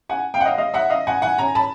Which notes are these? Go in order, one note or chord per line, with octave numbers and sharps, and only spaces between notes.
F#5 G#5
F5 G5
F#5
D#5 F5
D#5 F5
E5 F#5
D#5 F5
F#5 G#5
F#5 G#5
G#5 A#5
A5 B5